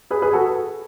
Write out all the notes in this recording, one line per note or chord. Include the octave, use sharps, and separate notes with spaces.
G#4 B4
G#4 B4
F#4 A4